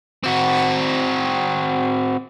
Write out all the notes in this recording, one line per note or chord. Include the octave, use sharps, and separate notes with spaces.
C4 F#4